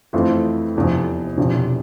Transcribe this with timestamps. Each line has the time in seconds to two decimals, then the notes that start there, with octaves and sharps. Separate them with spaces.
0.13 F2 E3 A3 C4 F4
0.76 F1 E2 C3 F3
1.38 E1 E2 C3 F3